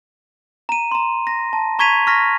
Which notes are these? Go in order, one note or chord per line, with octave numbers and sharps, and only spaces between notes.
A#5 D#7
A#5 C6
A#6
A5
A#5 C#6 G#6 B6 D#7 F7
C#6 F6 A#6 B6